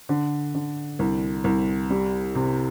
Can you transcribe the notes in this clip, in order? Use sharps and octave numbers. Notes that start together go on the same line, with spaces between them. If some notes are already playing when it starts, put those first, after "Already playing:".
D3
D3
C2
C2
G3
C3